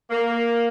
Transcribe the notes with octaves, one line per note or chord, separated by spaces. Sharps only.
A#3